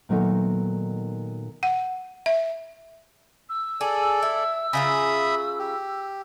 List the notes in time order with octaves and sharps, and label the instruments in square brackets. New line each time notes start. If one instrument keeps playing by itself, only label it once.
[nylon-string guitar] A#2 D#3 F#3 A3 B3 D#4
[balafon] F#5
E5
[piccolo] E6
[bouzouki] G#4 [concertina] A4 D5
[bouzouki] E4
[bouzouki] C#3 F4 A#5 [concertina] E5 B5 D#6
[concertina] G4